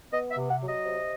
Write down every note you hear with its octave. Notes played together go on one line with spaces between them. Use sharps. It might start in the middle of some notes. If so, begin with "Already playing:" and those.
B3 D#5
E5
C3
F#5
F#3
D#5
C3